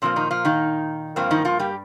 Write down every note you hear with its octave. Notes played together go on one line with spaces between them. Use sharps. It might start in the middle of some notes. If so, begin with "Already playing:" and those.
A#2 F3 A#3 C4
D#3 D#4
F3 F4
D#3 D#4
G2 F3 A#3 C4
D#3 D#4
F3 F4
G3 G4